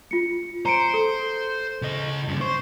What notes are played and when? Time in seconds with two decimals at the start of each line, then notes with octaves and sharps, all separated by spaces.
0.11 F4 C#7
0.65 C5 A#5 C#7 D7
0.94 A4
1.82 C#3 D#5
2.28 G2 C#3
2.41 C5 C#6